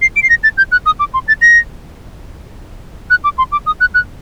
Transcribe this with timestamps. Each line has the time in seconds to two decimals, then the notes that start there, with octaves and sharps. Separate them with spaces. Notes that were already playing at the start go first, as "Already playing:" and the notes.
0.02 C7
0.16 D7
0.23 C7
0.30 A#6
0.44 A6
0.57 G6
0.72 F#6
0.86 D#6
1.00 D6
1.14 C6
1.28 A6
1.42 A#6
3.10 F#6
3.24 D6
3.38 C6
3.52 D6
3.66 D#6
3.81 F#6
3.94 F#6